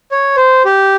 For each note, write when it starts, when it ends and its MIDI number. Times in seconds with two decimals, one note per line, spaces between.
0.12 0.36 73
0.37 0.63 72
0.65 0.96 67